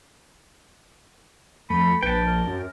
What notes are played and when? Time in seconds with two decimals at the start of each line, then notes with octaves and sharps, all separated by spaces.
1.70 F2 A3 B5
2.03 A#1 B4 G5 A5
2.27 A#4
2.47 F#2